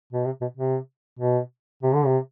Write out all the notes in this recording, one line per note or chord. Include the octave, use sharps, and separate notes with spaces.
B2
C3
B2
C3
B2
C3
D3
C3